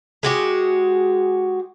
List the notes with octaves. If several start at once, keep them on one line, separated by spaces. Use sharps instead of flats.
G#3 F#4 G4